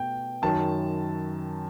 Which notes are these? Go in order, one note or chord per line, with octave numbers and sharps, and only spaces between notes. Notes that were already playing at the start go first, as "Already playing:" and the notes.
Already playing: B2 A3 G5
F#2 D#3 F#3 A5